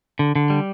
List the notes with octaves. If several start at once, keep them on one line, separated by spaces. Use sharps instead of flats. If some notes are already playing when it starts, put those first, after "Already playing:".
D3
D3
G3